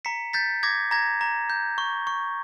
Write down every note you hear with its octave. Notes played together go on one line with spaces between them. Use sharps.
A#5 B6 C#7
G6 A6 B6
D6 G#6 A#6
A#5 G#6 A#6
A#5
G6
C#6
C#6